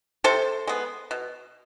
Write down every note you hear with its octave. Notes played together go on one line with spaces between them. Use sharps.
C3 A4 C5
G#3 B3
B2